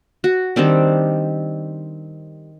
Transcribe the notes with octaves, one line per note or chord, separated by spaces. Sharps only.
F#4
D#3 G3 C4 D4